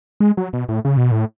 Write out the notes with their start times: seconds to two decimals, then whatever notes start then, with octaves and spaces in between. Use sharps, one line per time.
0.20 G#3
0.37 F#3
0.53 B2
0.69 A2
0.85 C#3
0.97 B2
1.11 A2